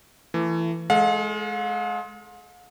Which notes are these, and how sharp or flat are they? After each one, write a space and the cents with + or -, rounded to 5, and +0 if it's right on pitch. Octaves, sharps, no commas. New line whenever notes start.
E3 +20 A3 +30
G#3 +30 A4 +0 F5 +45